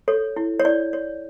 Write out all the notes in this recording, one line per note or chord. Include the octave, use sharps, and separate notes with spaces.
A4 C#5
E4
C#5
E4 D5
C#5